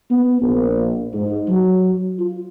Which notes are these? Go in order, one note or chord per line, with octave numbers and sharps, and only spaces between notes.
B3
A#1
G#2
F#3
F4